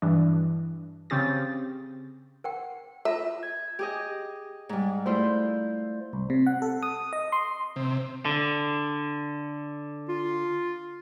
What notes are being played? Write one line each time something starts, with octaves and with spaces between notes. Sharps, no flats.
G2 E3 D4
C#3 C4 G4 A6
A#4 F#5 G5
F4 A4 E5
G#6
G4 G#4 D#5
G#2 G3
A3 E4 F4 C5 D5 C6
C2
C3
F#5
A4
D#6
D#5
C6
C3
D3
F4